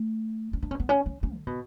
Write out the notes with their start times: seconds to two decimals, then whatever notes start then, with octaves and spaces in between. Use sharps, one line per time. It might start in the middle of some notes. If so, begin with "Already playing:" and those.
Already playing: A3
0.53 C#4
0.63 D4
0.71 C#4
0.80 B3
0.89 C#4
1.06 C#4
1.23 C#4
1.35 D3
1.47 B2